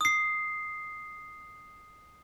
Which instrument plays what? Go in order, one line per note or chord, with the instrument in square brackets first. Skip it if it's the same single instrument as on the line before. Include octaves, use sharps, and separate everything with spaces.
[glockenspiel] D#6 C7